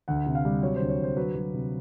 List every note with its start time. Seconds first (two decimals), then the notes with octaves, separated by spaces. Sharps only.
0.08 D2 F#5
0.26 C3
0.35 F5
0.45 G3
0.63 F#3 C#5
0.76 D2 C5
0.90 C#5
0.99 D2 C5
1.17 F#3 B4
1.35 F#3
1.54 C3